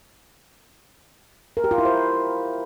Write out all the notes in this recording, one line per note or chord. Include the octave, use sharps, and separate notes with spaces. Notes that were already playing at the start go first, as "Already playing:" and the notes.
A#4
G4
F4
E4
C5